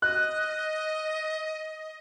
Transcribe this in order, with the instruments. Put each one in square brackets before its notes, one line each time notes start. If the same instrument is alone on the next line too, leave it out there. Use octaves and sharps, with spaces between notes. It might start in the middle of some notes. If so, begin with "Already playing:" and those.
[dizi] D#5 [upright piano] F#6